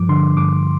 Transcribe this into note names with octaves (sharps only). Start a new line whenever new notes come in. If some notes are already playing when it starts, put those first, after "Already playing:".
Already playing: G2 F3 D6
D3 C6
G2 D6